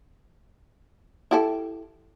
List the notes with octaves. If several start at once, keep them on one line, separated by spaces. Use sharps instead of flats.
E4 G4 A4